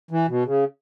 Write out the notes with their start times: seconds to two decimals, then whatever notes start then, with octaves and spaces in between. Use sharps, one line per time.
0.11 E3
0.28 B2
0.45 C#3